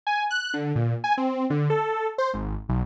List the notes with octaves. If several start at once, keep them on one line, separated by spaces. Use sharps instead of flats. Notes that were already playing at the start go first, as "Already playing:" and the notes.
G#5
F#6
D3
A#2
G#5
C4
D3
A4
C5
G#1
B1